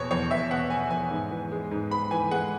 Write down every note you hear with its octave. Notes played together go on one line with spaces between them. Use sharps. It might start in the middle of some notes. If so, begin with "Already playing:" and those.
Already playing: E2 B2 B3 C#5
E2 C#5
E2 E5
B2 F#5
B3 G#5
E2 G#5
G#2
E3
G#3
G#2
G#2 B5
E3 G#5
G#3 F#5